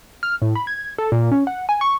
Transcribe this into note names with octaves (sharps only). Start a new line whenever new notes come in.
F6
A2
B5
G#6
A4
A#2
C#4
F#5
G#5
C#6